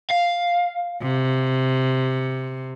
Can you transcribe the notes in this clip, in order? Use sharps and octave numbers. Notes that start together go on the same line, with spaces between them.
F5
C3